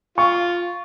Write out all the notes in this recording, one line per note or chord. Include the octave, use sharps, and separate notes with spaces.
F4 C#6